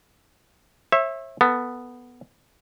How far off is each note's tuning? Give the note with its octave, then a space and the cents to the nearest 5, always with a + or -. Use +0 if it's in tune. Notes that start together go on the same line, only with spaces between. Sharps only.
C#5 -40 E5 +0
B3 +0 A4 +20